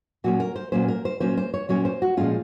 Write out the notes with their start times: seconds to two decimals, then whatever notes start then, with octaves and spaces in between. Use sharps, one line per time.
0.24 A#2 F#3 A#3 C#4 F#4
0.40 A#4
0.56 C5
0.72 A#2 F#3 A#3 C#4 C5
0.88 A#4
1.05 C5
1.20 A#2 F#3 A#3 C#4 C5
1.37 C5
1.54 C#5
1.69 A#2 F#3 A#3 C#4 C#5
1.85 C5
2.02 F#4
2.17 A#2 F3 G#3 C#4 F4